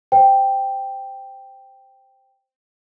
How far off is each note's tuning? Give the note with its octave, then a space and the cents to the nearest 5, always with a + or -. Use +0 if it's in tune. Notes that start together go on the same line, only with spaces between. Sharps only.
C5 +0 G5 +0